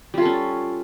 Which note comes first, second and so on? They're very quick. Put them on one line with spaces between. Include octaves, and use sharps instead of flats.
G3 F4 A4 C#4